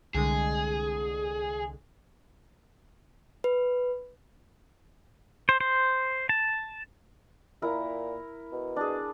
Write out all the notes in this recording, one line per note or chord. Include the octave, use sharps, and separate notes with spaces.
C2 D3 G#3 G#4
B4
C5
C5
A5
A#2 E4 A#4 A#5
B2
D4 G#4